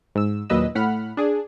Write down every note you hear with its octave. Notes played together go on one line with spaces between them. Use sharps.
G#2 E6
D#2 A#2 F#3 B4 D#5 E6
A2 F#5 B5 F6
D4 G#4